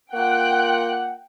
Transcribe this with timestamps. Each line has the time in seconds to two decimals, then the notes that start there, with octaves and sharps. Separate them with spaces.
0.13 A#3 F4 F#5 G5 F#6